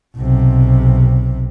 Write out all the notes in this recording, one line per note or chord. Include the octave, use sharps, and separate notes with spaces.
B1 C3